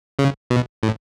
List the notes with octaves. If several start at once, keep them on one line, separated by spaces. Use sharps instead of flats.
C#3
B2
A2